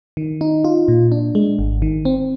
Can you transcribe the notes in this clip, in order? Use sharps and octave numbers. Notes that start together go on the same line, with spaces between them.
D#3
D#4
F4
A#2
D4
G#3
G#1
D#3
C4